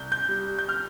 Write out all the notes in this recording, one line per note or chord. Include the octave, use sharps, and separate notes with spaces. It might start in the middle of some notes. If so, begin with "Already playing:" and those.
Already playing: C2 G6
G6
G3
G6
F6